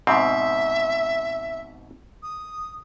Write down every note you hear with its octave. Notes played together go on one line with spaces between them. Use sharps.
G#2 B2 C4 E5
D#6